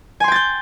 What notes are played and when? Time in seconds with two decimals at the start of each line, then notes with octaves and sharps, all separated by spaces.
0.20 G#5
0.24 C6
0.28 G5
0.32 A6
0.35 G6